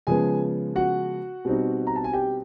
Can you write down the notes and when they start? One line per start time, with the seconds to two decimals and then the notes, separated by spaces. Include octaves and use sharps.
0.07 C#3 F3 G#3 B3 G#4 G#5
0.75 F#4 F#5
1.45 B2 G3 C4 D#4
1.87 A#5
1.96 A5
2.04 G#5
2.13 G4 G5